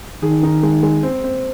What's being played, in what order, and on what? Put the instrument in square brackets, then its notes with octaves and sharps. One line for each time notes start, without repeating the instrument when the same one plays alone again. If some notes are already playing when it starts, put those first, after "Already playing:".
[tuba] D#3 [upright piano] G#4
[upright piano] D#4
G#3
G#3
C4
C4